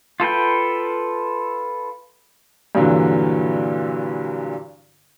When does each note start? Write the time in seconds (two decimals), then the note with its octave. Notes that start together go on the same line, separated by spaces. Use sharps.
0.20 F4 A4 B4 G5
2.75 G2 A#2 D3 E3 F#3